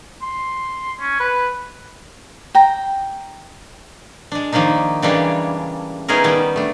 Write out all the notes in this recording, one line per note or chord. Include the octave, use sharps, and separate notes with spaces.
C6
C#4
B4
G5 A#5
G#3 D4
D#3 F3 A#3 D4 D#4
C#3 E3 G3 G#3 A#3 D4
B3 C#4 D#4 E4 G#4 A#4
D#3 G3 B3
A3 D4